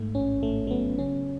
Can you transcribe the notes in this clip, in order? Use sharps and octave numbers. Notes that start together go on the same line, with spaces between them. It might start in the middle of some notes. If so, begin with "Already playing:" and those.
Already playing: G#2 A3
A1 C#4
A1 A3
A3
F#3 B3
C#3 C#4